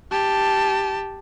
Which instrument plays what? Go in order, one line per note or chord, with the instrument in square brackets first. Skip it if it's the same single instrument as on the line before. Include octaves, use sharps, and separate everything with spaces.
[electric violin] G4 A5